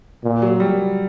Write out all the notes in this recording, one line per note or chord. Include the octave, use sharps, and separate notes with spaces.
A#2
F#3
G3